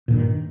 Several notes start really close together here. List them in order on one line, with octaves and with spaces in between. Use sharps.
A#2 D3 G2 D#3